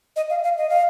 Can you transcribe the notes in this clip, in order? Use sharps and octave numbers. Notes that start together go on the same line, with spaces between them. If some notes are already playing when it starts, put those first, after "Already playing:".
D#5
F5
F5
D#5
F5